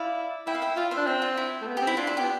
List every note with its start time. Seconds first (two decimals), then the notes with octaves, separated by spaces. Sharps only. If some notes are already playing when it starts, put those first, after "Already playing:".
Already playing: E4 D5 F5
0.47 E4 E5 G5
0.55 F5
0.62 E5 G5
0.76 F4 D5 F5
0.91 C5 E5
0.97 D4
1.07 C4 C5
1.22 F4
1.37 E4
1.62 A3
1.67 B3
1.77 G4
1.82 C4
1.87 E4
1.97 D4 F4
2.07 E4
2.17 B3 G4